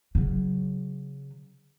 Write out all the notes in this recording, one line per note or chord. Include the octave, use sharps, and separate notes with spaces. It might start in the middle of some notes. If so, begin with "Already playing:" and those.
C#3 F#3